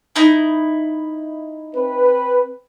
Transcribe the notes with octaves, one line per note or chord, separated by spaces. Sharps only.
D#4 E4
C4 B4